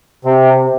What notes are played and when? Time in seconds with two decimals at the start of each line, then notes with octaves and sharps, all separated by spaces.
0.25 C3